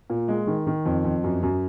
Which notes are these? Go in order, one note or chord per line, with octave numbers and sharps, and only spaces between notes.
A#2
G#3
D#3
D#3
F2
F2
F#2
F#2